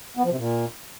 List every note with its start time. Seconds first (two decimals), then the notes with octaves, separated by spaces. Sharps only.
0.17 B3
0.24 F3
0.31 C3
0.37 A#2